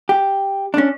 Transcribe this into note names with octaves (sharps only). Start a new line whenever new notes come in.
G4
C#4 D4